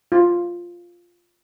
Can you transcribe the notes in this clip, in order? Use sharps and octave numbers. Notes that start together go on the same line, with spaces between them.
F4